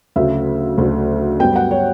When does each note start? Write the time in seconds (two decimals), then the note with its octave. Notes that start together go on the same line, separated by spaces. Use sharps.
0.16 D2 C#3 F#3 A3 E5
0.78 D2 C#3 F#3 A3
1.40 G2 F#3 B3 G5
1.56 F#5
1.71 C#5